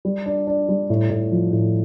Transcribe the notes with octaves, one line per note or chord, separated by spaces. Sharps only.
G3
D4
D4
G3
A2
A2
F3
A2